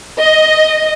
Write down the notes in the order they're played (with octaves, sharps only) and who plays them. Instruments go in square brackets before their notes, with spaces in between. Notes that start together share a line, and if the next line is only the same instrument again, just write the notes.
[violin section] D#5